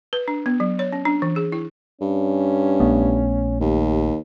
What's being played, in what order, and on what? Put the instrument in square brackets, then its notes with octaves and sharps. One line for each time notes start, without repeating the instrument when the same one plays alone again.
[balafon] B4
D4
B3
F#3
C#5
C#4
D4
E3
G#4
E4
[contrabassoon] G2 [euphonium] C#4
[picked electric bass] A#1 A3 B3
[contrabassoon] D#2 [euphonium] G4